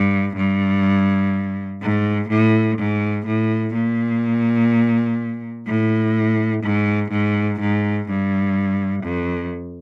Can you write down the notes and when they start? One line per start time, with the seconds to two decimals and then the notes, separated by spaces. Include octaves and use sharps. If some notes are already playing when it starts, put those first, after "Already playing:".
Already playing: G2
0.36 G2
1.82 G#2
2.29 A2
2.78 G#2
3.26 A2
3.74 A#2
5.67 A2
6.63 G#2
7.11 G#2
7.60 G#2
8.09 G2
9.04 F2